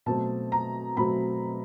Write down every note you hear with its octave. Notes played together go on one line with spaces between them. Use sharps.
B2 F#3 A3 C4 A5
A#5
B2 F#3 A3 C4 B5